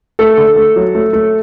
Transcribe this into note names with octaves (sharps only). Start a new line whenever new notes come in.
A3 A4
D3
A3
F#3
A3
A3